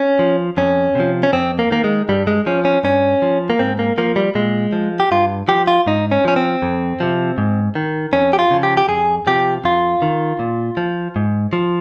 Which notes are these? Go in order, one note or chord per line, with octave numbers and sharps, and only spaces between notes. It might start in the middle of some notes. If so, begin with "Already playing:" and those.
Already playing: C#4
F3
F2 C#4
C3 F3
C#4
F2 C4
A#3
D#3 A#3
G#3
G2 G3
G#3
F3 C#4
C#4
G2 C#4
F3
A#3
G#2 C4
A#3
F3 A#3
G3
A#2 G#3
F3
G4
G2 F4
F3 G4
F4
G#2 D#4
C#4
F3 C#4
C4
F2
C3 F3
G#2
D#3
F2 C#4
G4
F4
C#3 F3
G4
G4
F2 G#4
C3 F3 G4
F2 F4
D#3
A#2
F3
G#2
F3